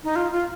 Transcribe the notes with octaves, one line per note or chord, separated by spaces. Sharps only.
D#4
F4
F4